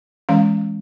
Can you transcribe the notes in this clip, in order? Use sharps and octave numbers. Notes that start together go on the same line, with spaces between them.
E3 G#3 C#4 F5